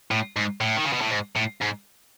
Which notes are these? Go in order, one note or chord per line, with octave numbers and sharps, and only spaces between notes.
A2
G#2
A2
D#3
C#3
B2
A2
G#2
A2
G#2